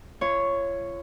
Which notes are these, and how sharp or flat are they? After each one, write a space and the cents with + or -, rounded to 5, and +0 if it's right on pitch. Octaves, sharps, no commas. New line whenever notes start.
F4 -35 C#5 +0